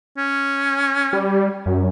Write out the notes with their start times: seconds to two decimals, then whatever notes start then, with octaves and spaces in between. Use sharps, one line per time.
0.17 C#4
1.13 G3
1.66 F#2